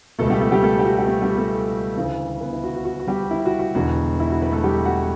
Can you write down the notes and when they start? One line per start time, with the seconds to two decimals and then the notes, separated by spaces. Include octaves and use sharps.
0.19 C#2 B2 A3 A4
0.30 G3 G4
0.41 A3 A4
0.52 G3 G4
0.63 A3 A4
0.79 G4
0.85 F#4
0.99 G4
1.08 A3 A4
1.22 G3 G4
1.38 A3 A4
1.97 D2 C#3 E3
2.41 B3 B4
2.53 E4
2.64 F#4
2.75 F#4
2.85 F#4
3.00 F#4
3.07 G3 G4
3.31 E4
3.46 F#4
3.59 F#4
3.75 E1 E2 D3 F#4
4.20 E4
4.30 F#4
4.42 B3 B4
4.52 A3 A4
4.64 G3 G4
4.85 F#4 F#5